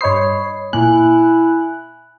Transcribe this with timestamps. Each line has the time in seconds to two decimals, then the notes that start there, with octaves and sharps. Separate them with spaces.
0.01 G2 C5 C#5 D#5 B5 D#6 C7
0.73 A#2 A#3 E4 G#5 F#6